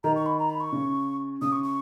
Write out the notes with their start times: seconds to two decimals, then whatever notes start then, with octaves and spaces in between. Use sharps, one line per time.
0.04 D#3 A#5
0.16 C#6
0.26 B5
0.39 A#5
0.50 B5
0.60 C#6
0.73 C#3
1.42 C#3 D#6
1.52 C#6
1.63 C#6